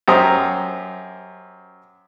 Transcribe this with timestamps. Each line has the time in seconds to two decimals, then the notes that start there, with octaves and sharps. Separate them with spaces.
0.08 F#2 G4 C5 A#5 D#6